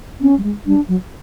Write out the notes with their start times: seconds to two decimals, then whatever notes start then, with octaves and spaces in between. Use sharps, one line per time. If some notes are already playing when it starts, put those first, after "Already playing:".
0.21 C4 C#4
0.38 G3
0.43 G#3
0.66 G3 D4
0.88 F#3